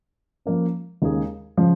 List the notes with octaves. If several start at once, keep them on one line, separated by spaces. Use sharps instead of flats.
F3 A#3 C#4
D#2 C#3 G#3 D#4 G#4
C#3 F3